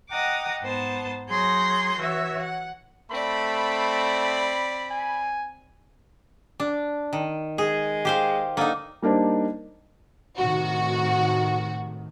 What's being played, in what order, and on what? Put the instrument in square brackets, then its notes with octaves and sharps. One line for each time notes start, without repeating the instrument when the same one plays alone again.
[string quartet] D#5 F#5 G5 A#5 D6 D#6
G#2 B3 C5 A5
F#3 G#4 C#5 C6 G6 A#6
E3 F#4 C#5 E5
F#5
[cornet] A3 [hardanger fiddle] C4 D5 [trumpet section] B5
[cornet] G#5
[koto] D4
D#3
[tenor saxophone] G#3 [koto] G#4
[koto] G4 C5 F5
[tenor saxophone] D3 [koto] A#3 D#4
[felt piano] G3 A#3 D4 D#4 C5
[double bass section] A2 C3 D#3 [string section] F#4